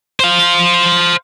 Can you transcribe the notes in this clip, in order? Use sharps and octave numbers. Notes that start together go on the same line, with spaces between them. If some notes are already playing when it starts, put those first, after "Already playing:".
C5 F5